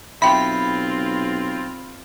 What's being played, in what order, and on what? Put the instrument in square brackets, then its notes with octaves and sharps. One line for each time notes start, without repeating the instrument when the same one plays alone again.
[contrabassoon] B1 [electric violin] C4 F4 [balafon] E5 G5 [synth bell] B5